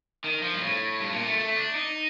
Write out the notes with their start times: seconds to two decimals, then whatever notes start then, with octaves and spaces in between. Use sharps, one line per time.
0.24 D#3
0.43 F3
0.54 G2
0.62 A2
1.00 G2
1.12 A#2
1.25 A3
1.38 A3
1.56 D4
1.75 D#4